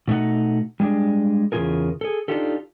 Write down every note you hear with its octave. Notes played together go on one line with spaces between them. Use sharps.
B2 A3 D#4 F#5
G3 G#3 D4
E2 C#3 F#3 F4 G#4 A#4
G#4 A4
D4 D#4 F4 G4 A4